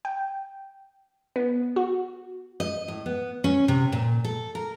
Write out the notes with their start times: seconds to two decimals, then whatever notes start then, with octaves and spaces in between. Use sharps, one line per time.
0.05 G5
1.36 B3
1.76 F#4
2.60 D#5
2.88 A2
3.06 B3
3.44 C#4
3.68 C3
3.92 A#2
4.24 A4
4.55 A#4